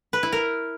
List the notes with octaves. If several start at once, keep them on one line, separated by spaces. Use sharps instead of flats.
B4
E4
A#4